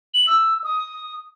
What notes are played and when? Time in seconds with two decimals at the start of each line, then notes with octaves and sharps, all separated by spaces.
0.14 F#7
0.27 E6
0.64 D#6